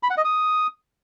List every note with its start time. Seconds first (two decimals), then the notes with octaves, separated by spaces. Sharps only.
0.03 B5
0.10 F#5
0.17 D#5
0.25 D#6